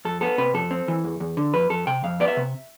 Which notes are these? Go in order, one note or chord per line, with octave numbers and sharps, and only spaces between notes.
F2 A4
B3 A4
C3 B4
F2 A4
C4
E3
E2
E2
D3
F2 B4
F2 A4
C3 G5
F2 F5
B3 D5
E5
C3